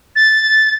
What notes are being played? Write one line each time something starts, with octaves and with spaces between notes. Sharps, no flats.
A6